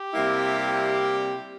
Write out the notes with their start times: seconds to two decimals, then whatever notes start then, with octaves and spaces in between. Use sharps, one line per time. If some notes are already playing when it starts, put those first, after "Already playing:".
Already playing: G4
0.13 C3 G3 A#3 E4
0.73 G4